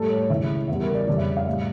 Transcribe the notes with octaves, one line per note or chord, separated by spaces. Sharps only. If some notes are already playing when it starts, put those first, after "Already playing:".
Already playing: A2 G3 A4
C#5
C#2 C#3 E3 E5
E2 C#3 G3 E5
A#4
D5
F2 C#3 G3 D5
E5
F5
A2 G3 E5